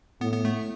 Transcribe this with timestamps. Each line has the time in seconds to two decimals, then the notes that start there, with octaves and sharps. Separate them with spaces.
0.21 A2 B3
0.33 B3
0.45 A3